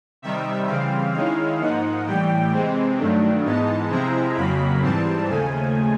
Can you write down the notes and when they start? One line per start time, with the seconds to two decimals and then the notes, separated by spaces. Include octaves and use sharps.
0.22 C3 D#3 G3 E5
0.68 C#3 E3 G3 C4 F5
1.14 D#3 G#3 C#4 E4 F5
1.60 G#2 F3 A#3 D#4 F#5
2.07 A2 E3 G3 G5
2.52 C3 E3 G#3 C4
2.98 G2 D#3 F#3 A3 D4
3.45 G#2 E3 G#3 B3 D#4 A5
3.90 C3 F3 G#3 C4 E4 A#5
4.36 F2 C#3 F#3 A#3 B5
4.82 G#2 E3 G3 C4 A5
5.28 D#2 C#3 F3 A3 G#5